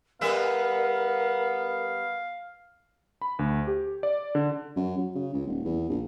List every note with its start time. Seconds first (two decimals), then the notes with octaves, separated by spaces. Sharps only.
0.21 G3 B3 A#4 B4 E5 F5
3.22 B5
3.39 D2
3.67 G4
4.03 D5
4.35 D3
4.76 F#2
4.98 F#3
5.15 C#3
5.34 C#2
5.47 D#1
5.65 E2
5.90 A#1